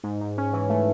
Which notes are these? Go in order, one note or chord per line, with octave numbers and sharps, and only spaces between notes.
G#2
G#2
C#4
E3
A3